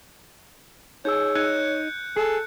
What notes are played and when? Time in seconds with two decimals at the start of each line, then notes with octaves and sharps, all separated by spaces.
1.05 D#4 G#4 C#5 E6 G6
1.35 D#4 F#6 G#6 C#7
2.17 G#4 A4